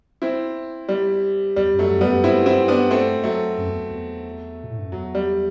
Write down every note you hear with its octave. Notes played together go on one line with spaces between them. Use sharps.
C4 E4
G3
E2 G3
F#2
F#3 A3
F#2
G3 B3
F#2
G2 C4 E4
C4 E4
B3 D4
A3 C4
F#3 A3
F#2
E2
E2
B2
A2
G2
F#2
E2 F#3
G3